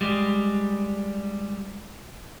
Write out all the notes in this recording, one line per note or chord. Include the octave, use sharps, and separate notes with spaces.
G3 G#3